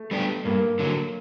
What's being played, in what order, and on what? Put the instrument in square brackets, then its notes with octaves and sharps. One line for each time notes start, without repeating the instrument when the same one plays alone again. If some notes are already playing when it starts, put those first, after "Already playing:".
Already playing: [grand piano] A3
[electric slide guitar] G3 B3 D4 G4
[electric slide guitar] G2 [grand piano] A#3
[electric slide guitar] D3 F#3